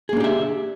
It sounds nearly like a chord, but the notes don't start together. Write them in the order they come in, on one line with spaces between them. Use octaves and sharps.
G#4 A#3 D4 G4 E5